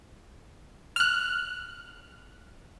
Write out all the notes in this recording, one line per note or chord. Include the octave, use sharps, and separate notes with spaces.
F6 F#6